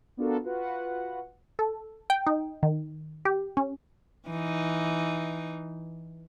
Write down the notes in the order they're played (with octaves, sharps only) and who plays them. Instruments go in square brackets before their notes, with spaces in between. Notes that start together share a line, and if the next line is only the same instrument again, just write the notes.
[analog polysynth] B3 D4 F4 F#4 A4 A#4
F4 F#4 B4 F#5
[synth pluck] A4
G5
D#4
D#3
G4
C#4
[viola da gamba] E3 D#4